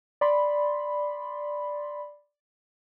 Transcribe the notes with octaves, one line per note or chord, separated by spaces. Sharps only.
D5 B5 C6